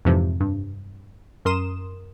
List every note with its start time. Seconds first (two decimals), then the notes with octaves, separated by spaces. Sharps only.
0.05 F2 G#2 C3 E3 F3
0.41 G2
1.45 F#2 A#4 C6 D#6 E7